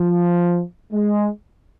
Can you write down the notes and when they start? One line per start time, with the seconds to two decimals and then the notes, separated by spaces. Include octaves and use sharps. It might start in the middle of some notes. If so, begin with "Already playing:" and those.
Already playing: F3
0.92 G#3